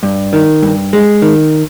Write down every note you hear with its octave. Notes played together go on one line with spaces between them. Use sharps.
G2
D#3
G2
G#3
D#3